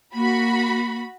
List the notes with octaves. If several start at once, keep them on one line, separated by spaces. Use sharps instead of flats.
A#3 F#4 B5